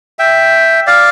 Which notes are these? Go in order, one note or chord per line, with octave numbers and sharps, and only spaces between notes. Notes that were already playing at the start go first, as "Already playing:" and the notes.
E5 G5
D5 F5